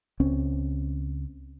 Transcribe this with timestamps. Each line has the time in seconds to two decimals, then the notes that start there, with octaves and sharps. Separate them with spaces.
0.20 C#2 C4 C#4